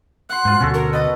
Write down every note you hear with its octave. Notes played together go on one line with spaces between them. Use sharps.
F#5 C6 F#6
G#2 F4 C5
D2 B2 C#4 F#4 A4
A#4
B3 B4 D#5 A5